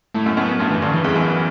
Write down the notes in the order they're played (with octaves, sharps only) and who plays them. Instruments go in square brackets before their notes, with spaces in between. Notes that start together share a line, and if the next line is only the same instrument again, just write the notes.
[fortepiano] A2 [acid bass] A3
[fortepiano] F#2
[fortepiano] F#2 [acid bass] B3
[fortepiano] G2 [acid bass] A3
[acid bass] E3
[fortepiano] G2 [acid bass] D3
[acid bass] E3
[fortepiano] E2
F#2